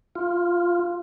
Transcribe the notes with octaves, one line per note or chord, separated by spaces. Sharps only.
F4